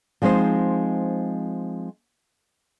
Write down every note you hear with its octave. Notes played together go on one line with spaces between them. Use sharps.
F3 G#3 C4 D#4 C5